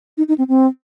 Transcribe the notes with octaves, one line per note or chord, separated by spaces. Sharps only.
D#4
D#4
C4
C4